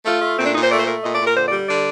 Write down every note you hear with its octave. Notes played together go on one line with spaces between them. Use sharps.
A3 F4
A3
A#2 C4
D4
A#2 D#4
C5
A3 D5
C5
A3 A#4
A#2 D#5
D5
A#2
A#4
D3 C5
D5
G3
D3 D5